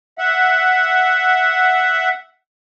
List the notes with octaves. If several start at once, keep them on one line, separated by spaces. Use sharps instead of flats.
E5 F#5